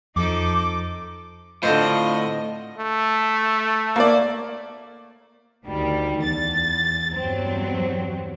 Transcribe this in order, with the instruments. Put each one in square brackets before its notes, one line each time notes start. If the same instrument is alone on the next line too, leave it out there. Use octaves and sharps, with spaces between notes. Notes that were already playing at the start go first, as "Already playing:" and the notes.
[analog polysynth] F2 [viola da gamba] F3 D#4 A4 [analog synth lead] D6
[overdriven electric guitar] A2 [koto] D3 C4 C5 [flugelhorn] F4 [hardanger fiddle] D#5
[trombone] A3
[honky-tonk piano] A#3 D5
[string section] D2 D#3 G3
E2 A6
E2 G2 F#3 C4